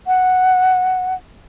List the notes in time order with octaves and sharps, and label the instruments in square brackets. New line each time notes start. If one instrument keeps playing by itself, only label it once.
[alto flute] F#5